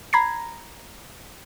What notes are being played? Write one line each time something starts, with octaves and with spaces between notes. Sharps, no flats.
A#5 B5 G#6 A#6 C7